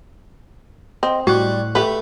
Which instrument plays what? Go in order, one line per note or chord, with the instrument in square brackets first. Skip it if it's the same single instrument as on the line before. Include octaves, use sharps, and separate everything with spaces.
[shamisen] C4 [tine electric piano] D#5
[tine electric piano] A2 C#6 F#6 [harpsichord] G3 [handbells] F#4
[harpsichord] A3 [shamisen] G4 B4